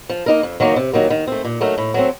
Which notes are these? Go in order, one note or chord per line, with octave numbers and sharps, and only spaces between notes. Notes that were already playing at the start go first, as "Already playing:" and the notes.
F3
A#3 D#4 A#4
F2
D#3 F#3 A#3 D#4
C3
D#3 F#3 A#3
D#3
A3 C4
A#2
F#3 A3 D#4 A#4
A2
F#3 A3 C4